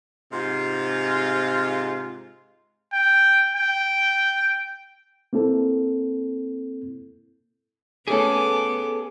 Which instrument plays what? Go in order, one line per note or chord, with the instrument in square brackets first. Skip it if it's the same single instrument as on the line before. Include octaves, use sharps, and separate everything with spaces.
[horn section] G#2 C3 G#3 F4
[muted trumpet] G5
G5
[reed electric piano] A#3 C4 E4 A4
[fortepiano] A3 C#4 [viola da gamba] B3 [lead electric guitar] G#4 A4 [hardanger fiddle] D6